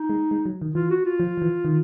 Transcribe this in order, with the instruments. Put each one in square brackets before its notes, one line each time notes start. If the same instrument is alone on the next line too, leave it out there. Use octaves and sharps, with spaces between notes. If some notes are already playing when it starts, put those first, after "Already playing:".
Already playing: [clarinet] D#4
[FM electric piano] G#3
G#3
F#3
D#3
[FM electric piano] E3 [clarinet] F4
[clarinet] F#4
F4
[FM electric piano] F3
F3
E3
D#3